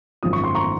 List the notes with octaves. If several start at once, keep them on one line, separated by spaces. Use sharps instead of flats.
G#1 F#2 F3 D#6
C#6
C6
A#5 C#6